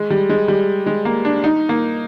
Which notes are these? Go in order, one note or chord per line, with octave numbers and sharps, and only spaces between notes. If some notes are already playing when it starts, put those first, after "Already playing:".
Already playing: G#3
G3
G#3
G3
G#3
A#3
D4
D#4
A#3